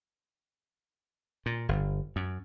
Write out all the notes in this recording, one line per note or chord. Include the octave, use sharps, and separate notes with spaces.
A#2
G1
F#2